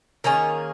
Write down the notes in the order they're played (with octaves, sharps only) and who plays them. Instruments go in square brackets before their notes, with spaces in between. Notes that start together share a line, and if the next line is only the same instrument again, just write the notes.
[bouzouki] D#3 A#3 C#4 G#4